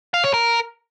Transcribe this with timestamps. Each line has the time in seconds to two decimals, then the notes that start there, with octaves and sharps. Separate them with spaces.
0.14 F5
0.24 C#5
0.34 A#4